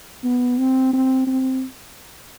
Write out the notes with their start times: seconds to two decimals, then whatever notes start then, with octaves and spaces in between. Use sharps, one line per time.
0.24 B3
0.58 C4
0.93 C4
1.27 C4